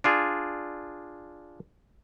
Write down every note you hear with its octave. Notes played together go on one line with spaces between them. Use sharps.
D4 F4 G#4